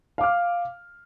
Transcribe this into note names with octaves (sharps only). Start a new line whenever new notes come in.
F5 D6 F6